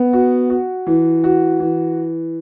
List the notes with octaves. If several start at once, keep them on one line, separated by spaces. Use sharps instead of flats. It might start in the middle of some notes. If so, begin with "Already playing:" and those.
Already playing: B3
F#4
F#4
E3
F#4
E3